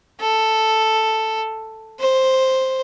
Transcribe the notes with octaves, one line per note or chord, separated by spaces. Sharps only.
A4
C5